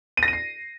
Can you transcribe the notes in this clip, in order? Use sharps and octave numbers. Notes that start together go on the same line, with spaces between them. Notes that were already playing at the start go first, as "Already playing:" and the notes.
D#7
A#6
D#7
C7